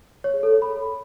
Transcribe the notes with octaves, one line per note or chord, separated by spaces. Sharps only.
C#5
G#4
A4
C#5
B5